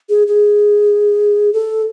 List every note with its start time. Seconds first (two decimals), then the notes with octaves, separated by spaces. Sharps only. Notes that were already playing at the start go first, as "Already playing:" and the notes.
0.09 G#4
0.27 G#4
1.53 A4